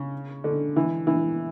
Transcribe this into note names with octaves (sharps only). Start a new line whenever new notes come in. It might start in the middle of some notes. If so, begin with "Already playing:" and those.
Already playing: C#3
D3
E3
E3